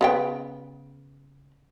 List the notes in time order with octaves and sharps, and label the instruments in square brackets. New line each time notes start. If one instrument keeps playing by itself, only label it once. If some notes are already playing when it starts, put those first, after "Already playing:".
[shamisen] C#3 B3 G5